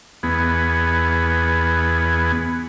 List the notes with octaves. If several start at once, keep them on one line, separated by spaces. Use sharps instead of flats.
E2 B3 G#4